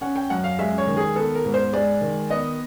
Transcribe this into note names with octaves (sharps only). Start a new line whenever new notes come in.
C#4 F#5
G5
F#2 F#5
F5
G#3 E5
C#5
D#3
G#4
B3 A4
A#4
G#2
C5
G#3 D5
D#3
B3 D#5